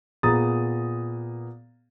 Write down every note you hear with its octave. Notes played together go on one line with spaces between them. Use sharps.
A#2 B3 G#4 A#5 D#6 A6